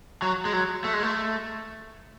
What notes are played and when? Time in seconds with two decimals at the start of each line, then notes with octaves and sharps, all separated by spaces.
0.22 F#3
0.45 G#3
0.53 F#3
0.84 A3
0.93 G#3
1.03 A3